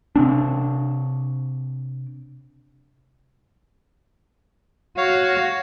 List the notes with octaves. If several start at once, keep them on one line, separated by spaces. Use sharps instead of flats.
C3 C4 D4
F#4 C#5 F5